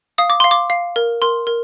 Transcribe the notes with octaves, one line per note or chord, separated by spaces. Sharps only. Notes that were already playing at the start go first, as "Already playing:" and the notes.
F5 D#6
D6
F5 C6
D6
F5
A#4
A#4 C6
A#4